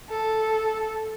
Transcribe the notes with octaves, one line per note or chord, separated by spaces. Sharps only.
A4